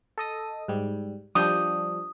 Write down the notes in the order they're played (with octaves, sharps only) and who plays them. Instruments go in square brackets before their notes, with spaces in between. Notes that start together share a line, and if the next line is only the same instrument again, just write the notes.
[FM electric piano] A4 D#5 D#6
G#2 G3
[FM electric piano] F3 G3 D4 [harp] D#6 G6